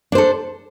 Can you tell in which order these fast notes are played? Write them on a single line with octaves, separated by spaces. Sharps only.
D4 C5 A4